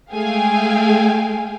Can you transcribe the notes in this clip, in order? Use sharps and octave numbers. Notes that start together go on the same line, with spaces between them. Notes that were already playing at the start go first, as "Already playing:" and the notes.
G#3 A3 G#4 F5 G5 G#5